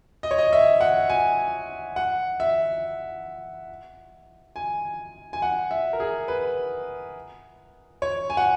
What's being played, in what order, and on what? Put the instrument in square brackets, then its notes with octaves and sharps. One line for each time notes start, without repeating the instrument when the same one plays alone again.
[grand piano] D#5
C#5
D#5
E5
F#5
G#5
F#5
E5
G#5
G#5
F#5
E5
A#4
G#4
B4
C#5
G#5
F#5